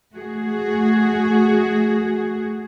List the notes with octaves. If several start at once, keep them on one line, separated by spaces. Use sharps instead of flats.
A3 F#4 G#4